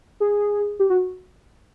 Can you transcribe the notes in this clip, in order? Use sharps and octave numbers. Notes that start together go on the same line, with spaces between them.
G#4
G4
F#4